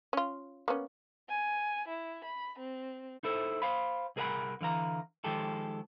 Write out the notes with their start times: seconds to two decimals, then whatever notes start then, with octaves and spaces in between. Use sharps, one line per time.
0.13 C#4 F4
0.68 A#3 B3 C#4
1.29 G#5
1.88 E4
2.25 B5
2.59 C4
3.23 D#4 E4 A4 C5
3.62 C5 F5 B5
4.16 C2 G#4 A#4 D#5 F#5 B5
4.61 D3 E3 F5 A#5
5.24 D#3 F3 G#3 G4 A4